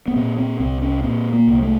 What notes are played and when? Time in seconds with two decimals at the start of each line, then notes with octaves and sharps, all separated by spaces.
0.08 B3
0.16 A#2 C4
0.38 C4
0.60 C2 C4
0.82 C#4
1.04 A#2 C4
1.33 A#3
1.47 C2
1.62 A3